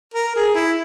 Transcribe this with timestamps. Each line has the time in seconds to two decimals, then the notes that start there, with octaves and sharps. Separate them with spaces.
0.14 A#4
0.35 G#4
0.54 E4